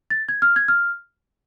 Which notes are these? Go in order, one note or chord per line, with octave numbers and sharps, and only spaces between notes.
A6
G#6
F6
G#6
F6